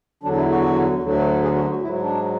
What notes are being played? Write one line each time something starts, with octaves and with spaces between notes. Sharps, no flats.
E2 D3 F#3 D4
E4
F#4
D2 D3 F#3
G#4
F#4
F#4
G#2 F#3 E4
D4